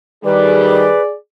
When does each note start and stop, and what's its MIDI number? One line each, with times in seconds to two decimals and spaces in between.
0.25 0.91 51
0.25 0.91 55
0.25 1.15 68
0.25 1.02 71
0.25 1.15 74